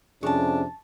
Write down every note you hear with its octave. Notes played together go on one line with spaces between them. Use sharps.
F2 C3 C#4 D4 G#4 A5 C#6